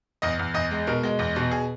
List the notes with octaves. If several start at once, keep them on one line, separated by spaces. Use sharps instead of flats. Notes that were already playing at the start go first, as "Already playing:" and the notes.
E2 D#5
E2
E2 D#5
G#3
B2 A#4
G#3
E2
B2
G#4